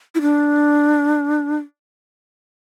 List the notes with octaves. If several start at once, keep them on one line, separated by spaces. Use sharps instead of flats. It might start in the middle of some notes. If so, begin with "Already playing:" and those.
E4
D4